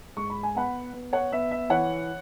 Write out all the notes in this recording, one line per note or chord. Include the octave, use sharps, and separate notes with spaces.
G#2 C#6
B5
G#5
B3 F#5 B5
B3
C#5 F#5
B3 E5
E5
E3 C#5 F#5